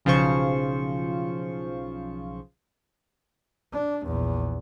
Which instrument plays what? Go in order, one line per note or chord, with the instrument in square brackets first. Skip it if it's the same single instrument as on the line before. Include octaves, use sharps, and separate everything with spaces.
[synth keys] B1 C#3 F3 F4 C5 C#6
[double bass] D4
A#1 E2